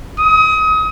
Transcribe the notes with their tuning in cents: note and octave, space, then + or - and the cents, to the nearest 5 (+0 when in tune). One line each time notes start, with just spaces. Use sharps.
D#6 +30